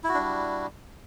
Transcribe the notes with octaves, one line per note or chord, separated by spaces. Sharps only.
G3 D4 E4 F#4